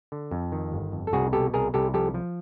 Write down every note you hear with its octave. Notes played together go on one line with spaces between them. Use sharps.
D3
F2
D#3
G1
F2
A4
C2 F#4 G#4
B2 G4 A4
C2 G#4 A#4
C2 G4 A4
F3 G4 A4
F3